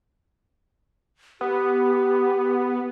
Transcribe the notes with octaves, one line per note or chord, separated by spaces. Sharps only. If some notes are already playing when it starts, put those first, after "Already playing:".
B3 G4